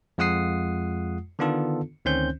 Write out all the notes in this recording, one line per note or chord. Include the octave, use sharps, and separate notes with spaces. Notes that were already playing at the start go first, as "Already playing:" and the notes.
F2 G#3 F4 F#5 D#6 C7
D3 D#3 B3 D4 F4 A4
D2 D#3 C4 C#4 C5 G6